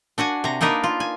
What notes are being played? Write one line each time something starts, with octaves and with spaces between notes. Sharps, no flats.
D4 F#4 F#5 G#5
C3 A#5
A#3 D4 D#4 A#4 B4
F4
G#5